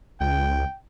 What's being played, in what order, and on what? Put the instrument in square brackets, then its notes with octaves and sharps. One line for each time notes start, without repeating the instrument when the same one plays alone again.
[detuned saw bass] C#2 [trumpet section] G5